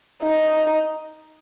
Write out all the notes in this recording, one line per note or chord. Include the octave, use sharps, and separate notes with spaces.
D#4